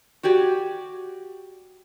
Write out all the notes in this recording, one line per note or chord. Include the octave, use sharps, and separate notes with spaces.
F#4 G4 D5 G#5